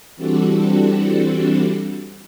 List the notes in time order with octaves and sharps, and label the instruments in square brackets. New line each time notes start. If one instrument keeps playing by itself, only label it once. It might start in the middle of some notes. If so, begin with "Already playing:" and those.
[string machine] E3 G3 C4 D4 F#4 A4